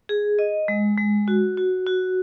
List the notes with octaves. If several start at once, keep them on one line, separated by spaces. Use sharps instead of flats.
G#4
D#5
G#3
G#3
F#4
F#4
F#4